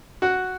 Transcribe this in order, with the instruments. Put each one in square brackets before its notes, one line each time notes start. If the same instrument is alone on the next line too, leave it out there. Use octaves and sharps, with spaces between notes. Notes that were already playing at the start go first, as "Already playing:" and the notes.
[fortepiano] F#4 F#5